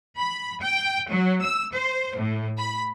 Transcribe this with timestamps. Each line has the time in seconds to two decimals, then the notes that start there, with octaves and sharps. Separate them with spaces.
0.19 B5
0.61 G5
1.10 F#3
1.42 E6
1.74 C5
2.16 A2
2.58 B5